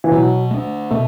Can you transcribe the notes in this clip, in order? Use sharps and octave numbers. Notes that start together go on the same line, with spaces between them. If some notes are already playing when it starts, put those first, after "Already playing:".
E3
B2 F#3
A3 D4
B2 A3